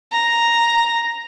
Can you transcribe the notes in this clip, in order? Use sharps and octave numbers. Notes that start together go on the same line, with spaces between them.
A#5